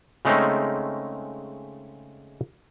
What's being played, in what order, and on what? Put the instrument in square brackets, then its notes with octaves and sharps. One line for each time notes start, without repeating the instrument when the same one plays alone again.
[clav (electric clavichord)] C#3 G#3 A3 C4 C#4 D#4